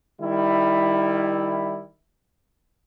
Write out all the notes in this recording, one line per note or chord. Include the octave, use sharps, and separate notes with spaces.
D#3 G3 E4